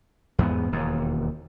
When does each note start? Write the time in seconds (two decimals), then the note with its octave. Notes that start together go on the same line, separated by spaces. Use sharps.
0.39 E2 G#2 B3
0.72 E1 D#2